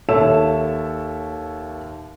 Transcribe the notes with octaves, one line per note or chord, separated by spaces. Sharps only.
D#2 A4 C#5 E5 A5 E7